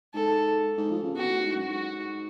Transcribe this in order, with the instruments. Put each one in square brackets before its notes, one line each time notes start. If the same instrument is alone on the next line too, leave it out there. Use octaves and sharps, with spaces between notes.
[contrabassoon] G#2 [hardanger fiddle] A4
[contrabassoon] G#2
F3
C#3
[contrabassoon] B2 [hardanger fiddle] F#4
[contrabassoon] A2
G#2
F#2
[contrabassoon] G#2 [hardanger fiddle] F#4